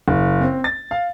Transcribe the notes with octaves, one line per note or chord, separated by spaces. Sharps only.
F#1
C4
A6
F5